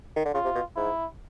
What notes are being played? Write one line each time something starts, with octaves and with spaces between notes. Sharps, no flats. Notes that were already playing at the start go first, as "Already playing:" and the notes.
D#3
D3
C#3 F4
C3
B2
G#2 E4